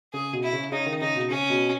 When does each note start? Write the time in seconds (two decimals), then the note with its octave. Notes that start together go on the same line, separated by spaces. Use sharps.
0.13 C#3 G#4
0.33 B2
0.43 E4
0.53 C#3
0.72 C#3 D#4
0.86 D#3
1.01 C#3 D#4
1.16 B2
1.30 C#3 C#4
1.50 B2